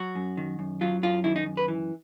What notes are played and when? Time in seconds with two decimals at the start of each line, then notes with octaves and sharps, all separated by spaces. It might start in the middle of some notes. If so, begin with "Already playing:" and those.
Already playing: F#3 F#4
0.15 F#2
0.37 D#3
0.59 F#2
0.81 F#3 F4
1.03 F#2 F4
1.24 D#3 E4
1.36 D#4
1.46 F#2
1.57 B4
1.68 E3